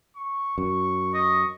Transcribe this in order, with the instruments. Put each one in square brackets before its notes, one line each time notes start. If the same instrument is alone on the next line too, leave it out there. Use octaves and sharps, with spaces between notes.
[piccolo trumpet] C#6
[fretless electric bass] F#2 [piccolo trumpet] C#6
[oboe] D#5 [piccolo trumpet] C#6